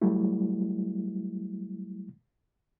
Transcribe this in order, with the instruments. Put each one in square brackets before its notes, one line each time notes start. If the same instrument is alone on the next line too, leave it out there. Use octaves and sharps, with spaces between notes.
[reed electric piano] F#3 G3 A3 E4